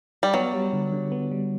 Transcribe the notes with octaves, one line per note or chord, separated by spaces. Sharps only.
G3
F#3 B3
G3
D3
D3
B3
G3